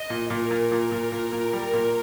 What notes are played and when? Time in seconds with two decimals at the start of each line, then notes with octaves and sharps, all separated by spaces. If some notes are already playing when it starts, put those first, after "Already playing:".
Already playing: D#5
0.10 A#2
0.30 A#2 A#4
0.51 A#2
0.72 A#2
0.92 A#2
1.12 A#2
1.32 A#2
1.53 G3
1.73 A#2